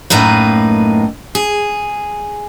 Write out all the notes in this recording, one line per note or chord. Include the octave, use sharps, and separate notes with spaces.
F#2 A2 A#3 D#4 B4
G#4